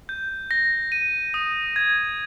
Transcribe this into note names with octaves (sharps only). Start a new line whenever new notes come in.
G6
A#6
D#7
D#6
G#6